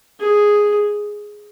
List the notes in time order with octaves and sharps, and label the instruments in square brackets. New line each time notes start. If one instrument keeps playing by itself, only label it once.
[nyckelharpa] G#4